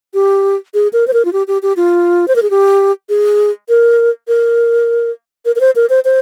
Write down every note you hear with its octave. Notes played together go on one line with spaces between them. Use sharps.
G4
G#4
A#4
C5
A#4
F4
G4
G4
G4
F4
C5
A#4
G#4
G4
G#4
A#4
A#4
A#4
A#4
C5
A#4
C5
C5